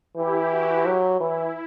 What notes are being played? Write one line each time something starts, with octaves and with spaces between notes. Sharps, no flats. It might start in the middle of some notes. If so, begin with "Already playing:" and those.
E3 E4 G4
F#4
F#3
E3 E4